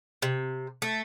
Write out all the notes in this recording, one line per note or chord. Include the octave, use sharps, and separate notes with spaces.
C3
A3